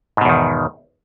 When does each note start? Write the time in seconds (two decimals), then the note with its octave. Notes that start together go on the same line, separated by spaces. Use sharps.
0.17 G#2
0.21 B2
0.25 E2
0.29 D#3